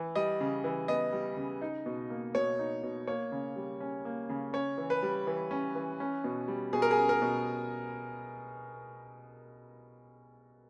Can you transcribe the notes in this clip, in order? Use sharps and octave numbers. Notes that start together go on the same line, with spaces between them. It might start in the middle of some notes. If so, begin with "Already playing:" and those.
Already playing: E3
G3 D#5
C#3
E3
B3 D#5
G3
C#3
D#4
B2
A#3
B2 C#5
D#4
B2
A#3 C#5
C#3
G3
C#4
A#3
C#3
C#4 C#5
E3
B4
G3
E3
C#4
E3
C#4
B2
G3
B2 G#4
A#4
G#4
C#4
A#4
B2